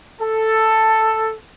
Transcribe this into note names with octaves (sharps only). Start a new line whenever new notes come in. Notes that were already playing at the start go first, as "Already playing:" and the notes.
A4